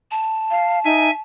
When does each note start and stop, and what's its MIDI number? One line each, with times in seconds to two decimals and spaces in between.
0.11 1.21 81
0.51 0.79 77
0.85 1.09 63
0.85 1.11 76
0.85 1.11 80